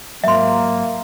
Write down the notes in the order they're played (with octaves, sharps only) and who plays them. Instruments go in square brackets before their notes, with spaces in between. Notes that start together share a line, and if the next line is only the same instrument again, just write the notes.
[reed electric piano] G#2 F#3 [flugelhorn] A#3 [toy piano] E5 C6